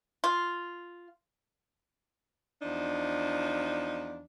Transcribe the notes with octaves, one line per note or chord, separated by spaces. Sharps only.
F4
E2 F3 D4 D#4